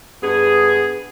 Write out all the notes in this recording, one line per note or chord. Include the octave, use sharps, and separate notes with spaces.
G2 B3 G#4